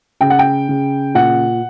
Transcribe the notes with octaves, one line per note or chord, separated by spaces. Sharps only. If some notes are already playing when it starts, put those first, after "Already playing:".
C#3 G5
F#5
G5
C#3
A#2 F#5